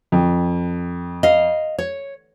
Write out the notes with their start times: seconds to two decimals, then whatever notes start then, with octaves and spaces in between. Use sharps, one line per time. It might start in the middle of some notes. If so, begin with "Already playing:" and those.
0.12 F2
1.23 D#5 F5
1.78 C#5